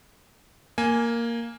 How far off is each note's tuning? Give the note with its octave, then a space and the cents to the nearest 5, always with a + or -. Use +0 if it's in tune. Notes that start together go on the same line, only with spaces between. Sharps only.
A#3 +0 G#5 +5